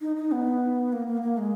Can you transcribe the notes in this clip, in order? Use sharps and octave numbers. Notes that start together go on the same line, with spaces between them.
D#4
D#4
B3
A#3
A#3
A#3
G#3